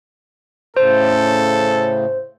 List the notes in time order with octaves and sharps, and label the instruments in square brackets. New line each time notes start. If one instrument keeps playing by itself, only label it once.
[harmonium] A2 C#3 [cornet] A4 [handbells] C5